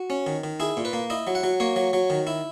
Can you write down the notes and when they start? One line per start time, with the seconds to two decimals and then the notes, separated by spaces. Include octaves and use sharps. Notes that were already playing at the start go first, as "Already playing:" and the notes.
Already playing: F#4
0.10 C#4
0.27 D#3
0.44 D#3
0.60 E4 G#4
0.77 A#2
0.85 B4
0.93 A#3
1.10 E4 D#5
1.27 F#3
1.35 F#5
1.43 F#3
1.60 A#3 C#5
1.76 F#3
1.93 F#3
2.10 D#3
2.27 E4